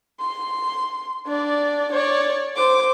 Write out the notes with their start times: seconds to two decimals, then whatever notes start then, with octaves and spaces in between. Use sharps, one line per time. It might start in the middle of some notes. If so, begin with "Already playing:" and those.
0.20 C6
1.27 D4 D5
1.93 C#5 D5
2.56 C5 D6